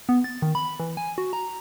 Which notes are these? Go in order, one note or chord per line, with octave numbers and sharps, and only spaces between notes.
B3
A6
D#3
B5
E3
G#5
F#4
A#5